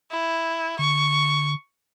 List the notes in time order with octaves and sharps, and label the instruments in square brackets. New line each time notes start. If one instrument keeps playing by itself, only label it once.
[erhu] E4
[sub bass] D3 [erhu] C#6